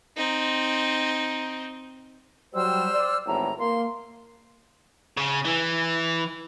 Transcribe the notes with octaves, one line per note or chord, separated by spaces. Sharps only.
C4 D#4
F#3 G3 C5 E6 F6
D5
G#1 E2 A2 A#5
A#3 C6
C#3
E3